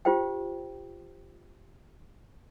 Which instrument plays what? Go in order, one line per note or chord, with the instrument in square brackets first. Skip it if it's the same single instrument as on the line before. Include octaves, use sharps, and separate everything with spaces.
[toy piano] F4 G4 C5 F5 G5